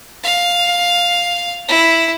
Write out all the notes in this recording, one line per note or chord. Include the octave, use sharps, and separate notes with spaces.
F5
E4